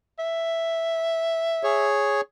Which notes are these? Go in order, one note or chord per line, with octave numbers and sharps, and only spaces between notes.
E5
G#4 C#5